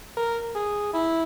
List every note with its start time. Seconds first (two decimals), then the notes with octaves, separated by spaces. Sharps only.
0.17 A#4
0.55 G#4
0.93 E4